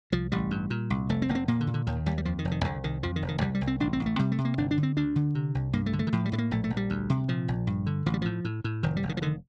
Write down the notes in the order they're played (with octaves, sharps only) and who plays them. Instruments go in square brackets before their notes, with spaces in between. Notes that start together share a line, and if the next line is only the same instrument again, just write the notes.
[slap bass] C2 F3
A1 G3
G2
A#2
C2
F1 A3
C4
F1 A#3
C4
A#2 A#3
D3
A#2
D3
D#2 D#3
D#2 G3
G3
F2 F3
D#3
F1
D#3
C2 D3
C2 D#3
F2 F3
D#3
F1
D#3
C2 G3
G3
C2
C4
A1 D4
C4
A1
A3
C3 G3
A3
C3
A#3
G1 D4
D4
D3
C4
D2 D4
D3
C3
C2
G2 A#3
A3
D3
A3
D#3
A2 F3
G3
A2 A3
A#3
A#1 A3
A3
A#1
G3
D2
C3
A#2 F3
A#1
G2
D3
A1 F3
G3
A2 F3
A2
A2
F1 D#3
G3
F1
D#3
F3
D3 D#3